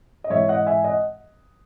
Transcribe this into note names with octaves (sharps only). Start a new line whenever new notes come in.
D#5
G#2 E3 G#3 C#5 E5
D#5 F#5
E5 G#5
D#5 F#5